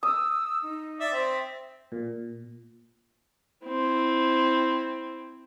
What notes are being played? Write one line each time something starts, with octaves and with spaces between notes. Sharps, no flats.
D#6 E6
D#4
D5 E5
C4 E5
A#2
C4 E4